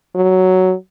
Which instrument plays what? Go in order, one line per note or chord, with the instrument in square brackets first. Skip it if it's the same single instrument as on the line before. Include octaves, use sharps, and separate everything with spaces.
[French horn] F#3